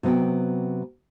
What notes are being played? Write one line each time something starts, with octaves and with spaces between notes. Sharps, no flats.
C3 F#3 B3 F#4 G5